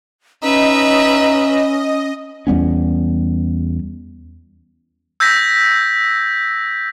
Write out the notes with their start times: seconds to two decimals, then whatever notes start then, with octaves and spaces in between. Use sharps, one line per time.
0.43 C#4 D#4 B4 D#5 E5
2.47 E2 G3 B3 C#4
5.20 E6 G6 G#6 A#6 B6